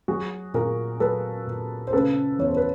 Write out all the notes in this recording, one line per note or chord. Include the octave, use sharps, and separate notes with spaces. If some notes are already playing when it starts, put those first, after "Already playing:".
F#3 F#4 G#4
A#2 G#4 A#4
F#3 A4 B4
A#2
C5
C#3 A4 B4
E2 C#5
C5
B4